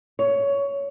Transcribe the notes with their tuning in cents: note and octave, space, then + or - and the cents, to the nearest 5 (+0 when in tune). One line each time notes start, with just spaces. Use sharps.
C#5 +15